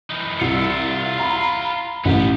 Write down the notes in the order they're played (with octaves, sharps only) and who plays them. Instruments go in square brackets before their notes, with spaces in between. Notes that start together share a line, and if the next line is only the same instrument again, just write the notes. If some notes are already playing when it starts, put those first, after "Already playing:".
[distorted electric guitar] E3 D#4
[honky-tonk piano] C2 C#7 [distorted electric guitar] F4 E5
[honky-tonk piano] A#5 B5
[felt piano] A1 [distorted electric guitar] B3 G4